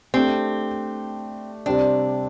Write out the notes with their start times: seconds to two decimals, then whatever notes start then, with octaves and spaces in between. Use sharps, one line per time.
0.14 A3 C4 D4 G4
1.66 C3 G3 C4 D4